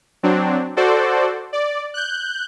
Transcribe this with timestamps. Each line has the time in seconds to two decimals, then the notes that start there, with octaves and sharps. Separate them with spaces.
0.23 F#3 C4 D4
0.77 F#4 A4 C5 D5
1.53 D5
1.94 F#6 G6